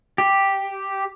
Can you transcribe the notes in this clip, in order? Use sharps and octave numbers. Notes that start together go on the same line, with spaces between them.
G4